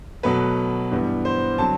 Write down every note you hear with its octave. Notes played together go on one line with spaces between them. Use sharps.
B2 F#3 A3 B4
G2 E3 G3 B3 E4
C5
D3 F#3 C4 A5